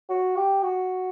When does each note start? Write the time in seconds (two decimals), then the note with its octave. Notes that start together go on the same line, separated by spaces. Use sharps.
0.09 F#4
0.37 G4
0.63 F#4